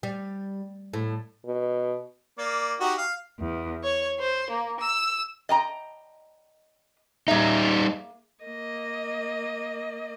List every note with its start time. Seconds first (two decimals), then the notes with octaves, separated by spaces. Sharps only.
0.03 G3
0.94 A2
1.46 B2
2.38 A#3 D5
2.80 D#4 F#4 G4
2.98 F5
3.38 E2
3.84 C#5
4.19 C5
4.50 A#3
4.81 E6
5.49 D#5 G5 A#5
7.28 G3 A#3 D#4 G#4 E5
8.44 A#3 D#5